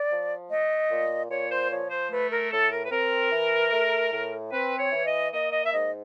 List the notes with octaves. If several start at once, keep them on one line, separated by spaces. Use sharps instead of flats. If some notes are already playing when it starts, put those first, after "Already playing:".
Already playing: D5
F3
A3 D#5
A#2
A#2 C#5
C5
F3 C#5
C5
A3 B4
A#4
A2 A4
A#4
B4
C4 A#4
E3
A3
A2
C4 B4
C#5
E3
D#5
A#3 D#5
D#5
E5
G#2 D#5